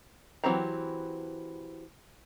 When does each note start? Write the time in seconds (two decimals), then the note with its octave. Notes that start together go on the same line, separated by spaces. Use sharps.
0.44 E3 F#3 C4 G4 A#5